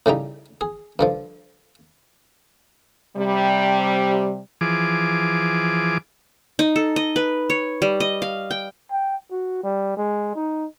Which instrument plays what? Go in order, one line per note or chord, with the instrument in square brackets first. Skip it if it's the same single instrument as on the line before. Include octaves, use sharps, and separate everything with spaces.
[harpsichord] A2 C#3 G3 D#4
G#4
G2 D3 F3
[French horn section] C3 G3
[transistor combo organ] E3 F3 G#4 D6
[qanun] D#4
A4
D#5
B4
C#5
G3
D#5
F5
G5
[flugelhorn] G5
F#4
G3
G#3
D#4